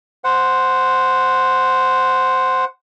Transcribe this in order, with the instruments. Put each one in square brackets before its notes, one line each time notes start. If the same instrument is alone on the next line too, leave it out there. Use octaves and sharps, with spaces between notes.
[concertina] C5 F#5